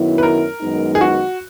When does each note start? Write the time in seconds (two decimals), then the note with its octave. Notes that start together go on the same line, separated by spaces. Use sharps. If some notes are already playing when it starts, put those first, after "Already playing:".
Already playing: F#2 D#3 F#3 B3 E4
0.18 B4
0.23 A#4
0.61 F#2 D#3 G#3 B3 D#4
0.95 G#4
1.01 F#4